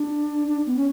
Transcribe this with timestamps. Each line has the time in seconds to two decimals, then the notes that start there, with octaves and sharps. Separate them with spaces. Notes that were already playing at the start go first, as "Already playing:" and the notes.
Already playing: D4
0.48 D4
0.67 B3
0.76 C#4